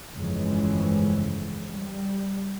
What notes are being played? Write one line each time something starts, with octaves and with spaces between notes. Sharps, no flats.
G1 F2 C#3 E3 G#3
G3